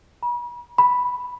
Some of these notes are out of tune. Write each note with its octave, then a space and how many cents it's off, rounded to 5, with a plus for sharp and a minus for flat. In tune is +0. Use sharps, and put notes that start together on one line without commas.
B5 -40
B5 +0